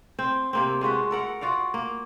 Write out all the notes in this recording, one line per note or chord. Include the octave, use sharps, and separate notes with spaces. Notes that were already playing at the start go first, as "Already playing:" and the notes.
C4 C5
C3 A#3 C4
G#3 F4 F#4 B4
A4 A#4 F#5
F4 F#4 D5 F5
A#3